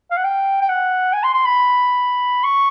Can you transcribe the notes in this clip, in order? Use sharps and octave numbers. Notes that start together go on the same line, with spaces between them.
F5
F#5
G5
G5
F#5
G#5
C6
C6
B5
C#6